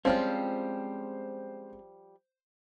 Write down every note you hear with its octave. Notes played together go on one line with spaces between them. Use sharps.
F3 G3 G#3 C4 C#4 F4 C5